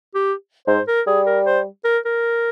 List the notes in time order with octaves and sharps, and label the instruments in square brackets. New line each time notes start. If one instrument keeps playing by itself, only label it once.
[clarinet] G4
[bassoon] G#2 [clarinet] C5
[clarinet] A#4
[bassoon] G3 [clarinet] G#4
[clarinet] A#4
C5
A#4
A#4